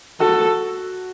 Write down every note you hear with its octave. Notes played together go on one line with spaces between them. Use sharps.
F#4 A4